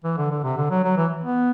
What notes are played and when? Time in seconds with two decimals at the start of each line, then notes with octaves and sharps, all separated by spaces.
0.04 E3
0.17 D3
0.30 D3
0.44 C3
0.57 D3
0.70 F#3
0.84 F#3
0.97 E3
1.24 B3